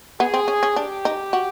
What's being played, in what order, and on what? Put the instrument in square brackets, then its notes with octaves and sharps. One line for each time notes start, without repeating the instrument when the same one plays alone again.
[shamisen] B3 [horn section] G#4
[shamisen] C4
C#4
C#4
[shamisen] D4 [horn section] G4
[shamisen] D#4
F#4